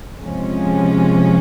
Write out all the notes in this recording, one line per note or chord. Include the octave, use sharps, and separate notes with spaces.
C3 F3 G#3 C#4